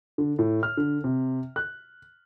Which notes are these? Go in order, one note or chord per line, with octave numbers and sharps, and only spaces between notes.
D3
A2
F6
D3
C3
F#6